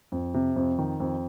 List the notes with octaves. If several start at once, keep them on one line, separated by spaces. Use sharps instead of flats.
F2
C3
F2
D#3
F2